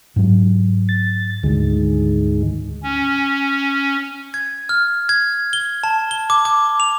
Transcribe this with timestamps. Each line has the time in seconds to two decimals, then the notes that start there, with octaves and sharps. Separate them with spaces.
0.16 G#2 F#3
0.89 A6
1.43 D2 G#2 D3 D#3 G#3
2.83 C#4
4.34 G#6
4.69 F6
5.09 G#6
5.53 G7
5.84 A5
6.11 G7
6.30 D6
6.45 D6
6.80 F7